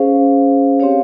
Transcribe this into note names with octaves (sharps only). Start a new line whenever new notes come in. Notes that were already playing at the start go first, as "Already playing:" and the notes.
Already playing: C#4 G#4 C5 F5
C4 G4 C#5 F5